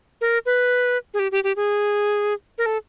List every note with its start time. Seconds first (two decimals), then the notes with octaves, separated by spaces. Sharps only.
0.21 A#4
0.46 B4
1.14 G#4
1.19 G4
1.32 G4
1.44 G4
1.56 G#4
2.58 A#4
2.66 A4